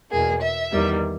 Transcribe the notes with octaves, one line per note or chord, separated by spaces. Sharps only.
E2 B2 A#3 G#4
E5
E2 D#3 G3 A#3